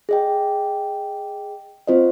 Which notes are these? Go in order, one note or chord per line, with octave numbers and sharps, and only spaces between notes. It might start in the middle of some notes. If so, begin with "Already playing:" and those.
G#4 D#5 G5
C4 F4 C5 D#5